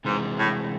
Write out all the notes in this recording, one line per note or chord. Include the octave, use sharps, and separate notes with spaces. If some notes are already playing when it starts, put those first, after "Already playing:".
G#2 C3 E3 G#3
A2